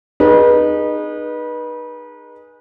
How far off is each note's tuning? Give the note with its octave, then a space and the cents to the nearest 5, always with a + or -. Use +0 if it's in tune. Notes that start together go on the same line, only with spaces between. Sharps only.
D#4 -25 G#4 +0 B4 -30